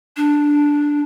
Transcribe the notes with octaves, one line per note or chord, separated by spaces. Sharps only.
D4